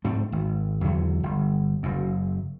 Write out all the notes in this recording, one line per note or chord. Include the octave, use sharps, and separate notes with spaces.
G#2 A3 C4 D4
G#1
E2 D3 F#3
G1
F#1 F#2